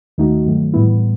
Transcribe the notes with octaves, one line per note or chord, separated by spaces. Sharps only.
D#2 D#3 A3 D#4 F#4
G2 D#3 F#3 A3
A2 E3 G3 B3 E4